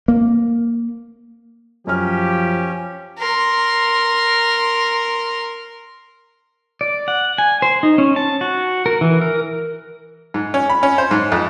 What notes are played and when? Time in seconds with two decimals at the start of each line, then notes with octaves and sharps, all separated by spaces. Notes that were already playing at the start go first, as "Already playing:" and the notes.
0.08 A#3
1.87 F#2 F3 C#4 G4 F6
3.18 A#4 C6
6.81 D5
7.08 F#5
7.38 G#5
7.62 C5
7.83 D#4
7.98 C#4
8.16 A5
8.41 F#4
8.86 A#4
9.01 E3
9.21 A#4
10.34 G#2
10.54 C#4
10.70 B5
10.83 C#4
10.98 C5
11.11 G#2
11.32 F2